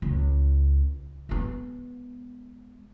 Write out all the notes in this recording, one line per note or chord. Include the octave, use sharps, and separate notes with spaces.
C#2
G#3 B3